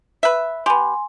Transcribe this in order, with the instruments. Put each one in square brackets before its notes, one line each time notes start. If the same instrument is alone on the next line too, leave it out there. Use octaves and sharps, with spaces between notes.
[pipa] B4 E5
[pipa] B3 G4 [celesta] G#5 C6